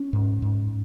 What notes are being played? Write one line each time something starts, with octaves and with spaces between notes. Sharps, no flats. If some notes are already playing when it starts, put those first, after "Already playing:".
Already playing: C#4
G#2
G#2